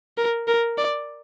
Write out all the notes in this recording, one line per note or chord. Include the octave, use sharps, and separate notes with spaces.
A#4
A#4
D5